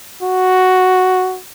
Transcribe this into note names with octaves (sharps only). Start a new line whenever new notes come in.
F#4